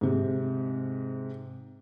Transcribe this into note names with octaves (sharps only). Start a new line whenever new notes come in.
G#2 C3